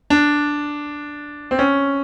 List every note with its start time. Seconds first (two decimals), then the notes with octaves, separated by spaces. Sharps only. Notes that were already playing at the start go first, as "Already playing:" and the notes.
0.10 D4
1.51 C4
1.59 C#4